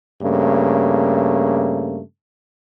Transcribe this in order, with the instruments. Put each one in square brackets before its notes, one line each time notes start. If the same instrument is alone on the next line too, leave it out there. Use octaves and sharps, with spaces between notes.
[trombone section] G2 C#3 A3 A#3